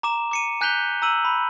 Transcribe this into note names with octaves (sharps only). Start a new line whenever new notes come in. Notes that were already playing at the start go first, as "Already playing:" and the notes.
A#5 D6 E7
D6 C#7 D#7
G#5 F#6 G6 B6 F7 G7
A#5 E6 D#7 F#7
B5